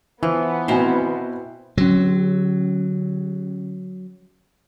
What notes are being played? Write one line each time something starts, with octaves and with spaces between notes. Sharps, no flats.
E3 F3 B3
B2 C4 E4 A#4 C5 G#5
D3 F#3 C#4